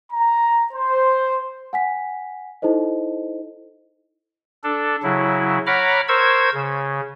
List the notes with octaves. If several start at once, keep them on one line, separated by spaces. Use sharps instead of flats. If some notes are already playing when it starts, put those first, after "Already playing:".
A#5
C5
F#5 G#5 B6
D#4 E4 A4 C5 D#5
D4 A4
C#3 F#3 E4
C#5 F#5 A#5 B5 D6 F6
A#4 C5 C#6 E6 G#6
C#3